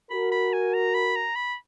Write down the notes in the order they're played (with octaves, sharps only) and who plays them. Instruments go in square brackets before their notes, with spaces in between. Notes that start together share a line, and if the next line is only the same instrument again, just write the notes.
[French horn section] F#4 A#4 [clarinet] B5
[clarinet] B5
G#5
A#5
B5
A#5
B5